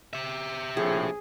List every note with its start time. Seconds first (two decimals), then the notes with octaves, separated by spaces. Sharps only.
0.13 G4 E5
0.77 A#1 A2 F3 G#4